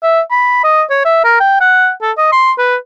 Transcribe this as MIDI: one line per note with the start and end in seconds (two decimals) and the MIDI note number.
0.03 0.21 76
0.31 0.59 83
0.64 0.83 75
0.90 1.03 73
1.05 1.20 76
1.24 1.37 70
1.40 1.59 79
1.61 1.91 78
2.02 2.12 69
2.18 2.27 75
2.32 2.52 84
2.58 2.76 71